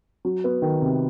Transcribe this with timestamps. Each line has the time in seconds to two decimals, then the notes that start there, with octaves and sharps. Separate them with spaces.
0.25 F#3
0.44 B3
0.62 D#3
0.82 C3